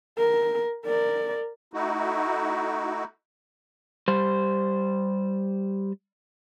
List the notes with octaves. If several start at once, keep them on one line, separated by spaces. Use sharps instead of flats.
A#4
A#4 D5
A3 D#4 E4 F#4
G3 C5